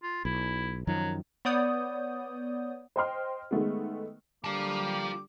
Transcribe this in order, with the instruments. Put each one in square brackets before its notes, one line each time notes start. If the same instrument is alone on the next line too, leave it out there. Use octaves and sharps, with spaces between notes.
[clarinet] F4
[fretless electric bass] B1 [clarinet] E4
[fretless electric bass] F#2 D#3 F3 [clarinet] F#3
[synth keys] B3 C#5 D5 D#6 G6
[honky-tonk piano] C5 D#5 G5 C6 F6
D#3 G#3 A3 B3
[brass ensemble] D3 G3 [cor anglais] A#3 [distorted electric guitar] F4 A5 [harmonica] D6